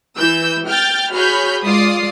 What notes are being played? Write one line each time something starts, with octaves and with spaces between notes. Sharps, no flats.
E3 E6 G6
G5 F6 G6 A6
F#4 G#4 C#5 B5 F6 G6
G#3 F4 D5 D#6 C7